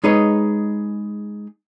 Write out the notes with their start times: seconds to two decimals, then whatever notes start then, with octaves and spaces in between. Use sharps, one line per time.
0.04 G#3 D#4 G#4 B4 C#5 D#5